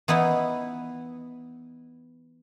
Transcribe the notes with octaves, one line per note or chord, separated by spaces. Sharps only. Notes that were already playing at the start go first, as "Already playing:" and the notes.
E3 B3 D#4 E4